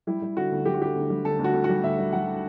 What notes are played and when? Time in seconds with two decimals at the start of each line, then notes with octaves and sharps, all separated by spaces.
0.07 G3 E4
0.22 G3
0.37 D3 F#4
0.52 D2
0.66 G3 G4
0.74 F#4
0.81 D3 G4
0.96 D2
1.10 G3
1.25 D3 A4
1.39 D2
1.44 F#4
1.54 D2
1.64 F#4
1.69 G3
1.83 D2 E5
1.98 G3
2.13 G3 F#5